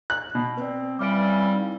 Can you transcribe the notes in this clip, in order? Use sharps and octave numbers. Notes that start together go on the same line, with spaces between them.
F#6
B2
C4 B4 D5
C#3 E3 G3 D6 F6 D7
D#4 E4 F5